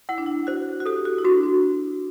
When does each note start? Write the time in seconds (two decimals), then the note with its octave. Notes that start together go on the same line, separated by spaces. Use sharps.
0.09 E4 F#5
0.18 D4
0.26 E4
0.47 F#4 C5
0.80 F#4
0.86 G4 A4
1.05 F#4
1.18 E4
1.24 D4 F#4
1.43 D4